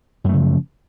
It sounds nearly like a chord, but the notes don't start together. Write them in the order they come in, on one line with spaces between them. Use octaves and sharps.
F#2 A3 C#3 F3